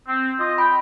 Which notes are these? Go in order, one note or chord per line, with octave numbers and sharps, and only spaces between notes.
C4
F4 D#5
G5 B5